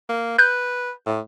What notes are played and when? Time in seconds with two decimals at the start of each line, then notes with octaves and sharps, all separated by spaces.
0.09 A#3
0.39 B4 F#6 G6
1.06 A2